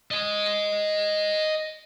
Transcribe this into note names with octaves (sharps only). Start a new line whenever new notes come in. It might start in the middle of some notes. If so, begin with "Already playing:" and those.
D#5 G#5